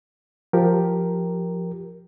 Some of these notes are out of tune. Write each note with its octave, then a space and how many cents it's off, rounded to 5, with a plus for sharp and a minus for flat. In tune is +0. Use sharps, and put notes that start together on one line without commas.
F3 +10 G4 +0 A#4 +0